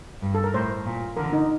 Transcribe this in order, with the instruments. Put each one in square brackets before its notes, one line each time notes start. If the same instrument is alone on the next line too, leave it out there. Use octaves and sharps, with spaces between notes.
[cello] G2
[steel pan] A4
A#4
[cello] A2 [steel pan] C5
[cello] A#2
[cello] D3 [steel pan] A#4
[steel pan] D#4